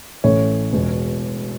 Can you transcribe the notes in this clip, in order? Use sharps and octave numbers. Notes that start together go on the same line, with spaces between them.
A1 A2 E3 A3 C#5
E1 E2 B2